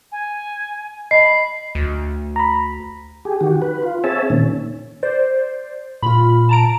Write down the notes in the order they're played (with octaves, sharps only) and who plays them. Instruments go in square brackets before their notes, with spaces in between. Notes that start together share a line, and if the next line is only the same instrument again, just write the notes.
[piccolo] G#5
[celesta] D#5 A5 [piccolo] B5 [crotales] C7
[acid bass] D2
[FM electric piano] A#5 B5
[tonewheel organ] G4 G#4
D#3 F#4 G4
B4
F4
C4 G#4 C#5 E5 A5
A#2 D#3 C#4
[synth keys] C5 D5
[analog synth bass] A#2 [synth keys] F4 B5
[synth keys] A5 A#5 D7